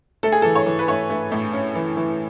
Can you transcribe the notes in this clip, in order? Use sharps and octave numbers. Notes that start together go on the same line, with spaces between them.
A3 A4
G#4
E3 A4
C#5
E3
B4
A3 C#5
A3
A2
C#4
E3
E3